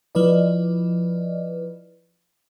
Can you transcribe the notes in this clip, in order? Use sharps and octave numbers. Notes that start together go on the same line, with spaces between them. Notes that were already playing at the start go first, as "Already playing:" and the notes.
F3 E4 B4 D5 D#5